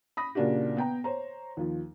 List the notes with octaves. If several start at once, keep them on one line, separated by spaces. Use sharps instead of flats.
B5 D#6 A#6
A#2 C#3 A#3 D4 F#4 G4
B3 G5 A#5
C5 C#5 A#5
D#2 F3